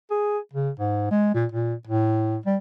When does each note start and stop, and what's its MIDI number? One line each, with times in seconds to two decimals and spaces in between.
0.11 0.39 68
0.53 0.70 49
0.79 1.09 44
1.11 1.33 56
1.35 1.46 46
1.52 1.74 46
1.88 2.38 45
2.46 2.56 55